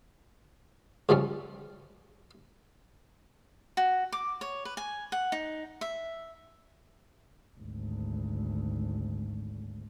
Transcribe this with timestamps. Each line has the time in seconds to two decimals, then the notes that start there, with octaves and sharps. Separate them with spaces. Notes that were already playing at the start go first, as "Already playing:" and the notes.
1.09 C#3 F3 G3 C#4
3.77 F#4
4.12 D6
4.41 C#5
4.65 B4
4.77 G#5
5.12 F#5
5.32 D#4
5.81 E5
7.59 G#1 D2